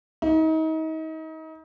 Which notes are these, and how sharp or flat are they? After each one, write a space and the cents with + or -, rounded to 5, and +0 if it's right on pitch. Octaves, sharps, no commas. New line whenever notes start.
D#4 +35